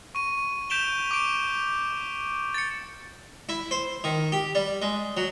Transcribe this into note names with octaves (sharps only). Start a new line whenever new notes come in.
C#6 D#7
G6 B6 D7 E7 F7 G7
D6 D7
A6 C#7
E4
C5
D#3
G4
G3
G#3
F#3